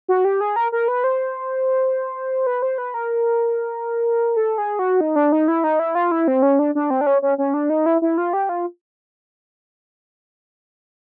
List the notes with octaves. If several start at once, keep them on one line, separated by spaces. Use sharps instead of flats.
F#4
G4
G#4
A#4
A#4
B4
C5
B4
C5
B4
A#4
A4
G#4
F#4
D#4
D4
D#4
E4
D#4
E4
F4
E4
C4
C#4
D4
D4
C4
D4
C#4
C#4
C#4
D4
D#4
E4
E4
F4
G4
F4